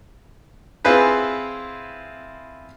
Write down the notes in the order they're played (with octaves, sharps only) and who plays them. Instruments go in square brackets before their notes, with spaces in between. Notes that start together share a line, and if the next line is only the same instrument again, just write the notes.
[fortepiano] C4 E4 F4 G#4 B4 C5